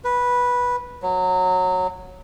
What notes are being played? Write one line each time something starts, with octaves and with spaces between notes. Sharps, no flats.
B4
F#3